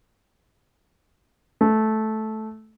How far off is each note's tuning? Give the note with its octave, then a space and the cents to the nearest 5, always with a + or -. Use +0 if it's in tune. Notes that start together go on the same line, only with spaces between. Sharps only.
A3 -10